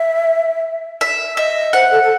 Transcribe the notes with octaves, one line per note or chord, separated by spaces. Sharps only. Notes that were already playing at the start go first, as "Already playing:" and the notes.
Already playing: E5
E5
D#5 E5
C5 F#5
A4
A4